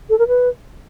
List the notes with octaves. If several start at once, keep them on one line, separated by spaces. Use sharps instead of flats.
A4
A#4
B4